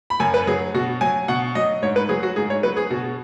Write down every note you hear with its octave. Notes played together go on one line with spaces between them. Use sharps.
B5
F#2 G#5
B4
F#3 G#4
B2 F#4
F#3 G#5
B2 F#5
F#3 D#5
G#2 C#5
B4
F#3 G#4
F#4
G#2 G#4
C#5
F#3 B4
G#4
B2 F#4